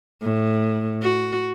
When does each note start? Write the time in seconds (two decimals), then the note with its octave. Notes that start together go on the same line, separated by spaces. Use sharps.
0.22 A2
1.02 F#4